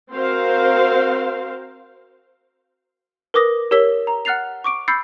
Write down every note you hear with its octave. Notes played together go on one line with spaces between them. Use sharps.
C4 F#4 A#4 C5 F5
A#4 B4 D6 D#6 A#6
G4 A#4 C#5 E6 B6 G7
A#5
F#5 F6 F#6 A6 C7 F7
C#6 D6 D7
B5 E6 G6 A6 C7 C#7